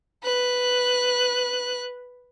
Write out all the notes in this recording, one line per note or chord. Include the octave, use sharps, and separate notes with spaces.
B4 F#6